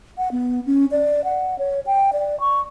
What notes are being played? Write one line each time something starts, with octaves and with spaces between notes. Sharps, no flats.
F#5
B3
C#4
D5
F#5
C#5
G5
D5
C#6